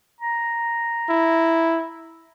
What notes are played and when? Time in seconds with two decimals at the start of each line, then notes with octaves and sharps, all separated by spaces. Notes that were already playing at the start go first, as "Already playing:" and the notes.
0.21 A#5
1.09 E4